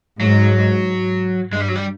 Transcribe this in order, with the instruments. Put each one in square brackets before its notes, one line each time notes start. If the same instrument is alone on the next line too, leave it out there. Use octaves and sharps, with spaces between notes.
[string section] G#2 [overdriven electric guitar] F#3
[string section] G2 [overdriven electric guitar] G#3
[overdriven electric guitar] G3
F#3
G3